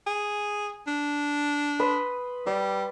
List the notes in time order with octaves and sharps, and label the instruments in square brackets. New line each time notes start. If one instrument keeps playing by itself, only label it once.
[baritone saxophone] G#4
D4
[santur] B4 C6 D#6
[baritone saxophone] G3 [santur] D5